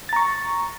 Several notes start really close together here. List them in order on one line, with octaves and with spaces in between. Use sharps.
A6 A#5 C#6